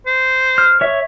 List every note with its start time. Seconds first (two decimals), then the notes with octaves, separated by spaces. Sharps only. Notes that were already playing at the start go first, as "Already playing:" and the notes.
0.07 C5
0.58 F6
0.81 C#5 E5